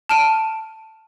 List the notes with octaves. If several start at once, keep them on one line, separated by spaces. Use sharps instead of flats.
A5 F6 D7 D#7